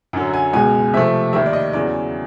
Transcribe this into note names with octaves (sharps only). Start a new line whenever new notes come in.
F#2 D3 F#3
G#5
C#2 B2 G#3 G#5
C3 F3 A3 E5
D#2 D#3 G3 E5
D5
D#5
E2 C#3 F#3 D5